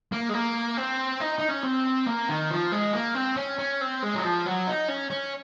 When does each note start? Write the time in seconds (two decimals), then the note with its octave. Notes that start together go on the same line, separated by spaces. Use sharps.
0.12 A#3
0.29 G#3
0.34 A#3
0.77 C4
1.21 D#4
1.39 D#4
1.50 C#4
1.64 C4
2.07 A#3
2.29 D#3
2.50 F3
2.72 G#3
2.93 A#3
3.15 C4
3.37 C#4
3.59 C#4
3.81 C4
4.02 G#3
4.15 F#3
4.23 F3
4.46 F#3
4.67 D#4
4.88 C#4
5.10 C#4